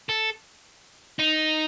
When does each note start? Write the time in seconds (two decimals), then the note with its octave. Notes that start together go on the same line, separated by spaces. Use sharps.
0.09 A4
1.19 D#4